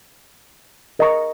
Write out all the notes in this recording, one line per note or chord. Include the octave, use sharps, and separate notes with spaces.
A#4 D#5 A#5 C#6